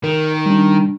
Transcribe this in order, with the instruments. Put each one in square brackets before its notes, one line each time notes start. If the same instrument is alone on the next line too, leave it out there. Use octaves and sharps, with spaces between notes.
[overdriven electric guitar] D#3 [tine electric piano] A#4
[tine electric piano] G3 D4